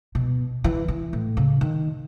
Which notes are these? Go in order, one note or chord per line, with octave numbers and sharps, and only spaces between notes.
B2
E3
E3
A2
C#3
D#3